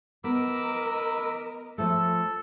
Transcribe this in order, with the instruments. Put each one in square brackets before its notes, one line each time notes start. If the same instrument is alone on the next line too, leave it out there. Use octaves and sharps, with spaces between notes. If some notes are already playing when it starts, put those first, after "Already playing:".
[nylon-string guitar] B3 [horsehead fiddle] A#4 D#5 [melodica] B5 D6 E6
[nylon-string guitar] F3 A3 [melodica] A4